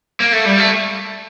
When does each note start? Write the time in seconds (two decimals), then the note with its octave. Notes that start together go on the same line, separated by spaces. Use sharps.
0.20 A#3
0.32 A3
0.45 G3
0.58 A3